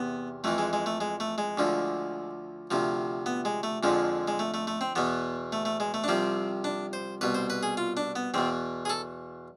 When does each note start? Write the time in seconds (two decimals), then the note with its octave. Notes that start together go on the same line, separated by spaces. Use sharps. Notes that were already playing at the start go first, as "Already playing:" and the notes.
Already playing: E2 C3 B3
0.44 F2 E3 A3
0.58 G#3
0.73 G#3
0.86 A3
1.01 G#3
1.20 A3
1.38 G#3
1.58 D2 D3 F3
2.71 D2 C3 F3
3.26 B3
3.45 G#3
3.63 A3
3.83 F2 D3 F3 G#3
4.28 G#3
4.39 A3
4.54 A3
4.67 A3
4.81 C4
4.96 E2 B2 B3
5.52 A3
5.65 A3
5.80 G#3
5.94 A3
6.04 D4
6.08 C2 C3 F3 C4
6.64 D4
6.93 C5
7.21 C2 B2 B4
7.34 C5
7.50 B4
7.63 G#4
7.77 F4
7.97 D4
8.16 B3
8.34 E2 B2 C4
8.85 G#4
8.90 A4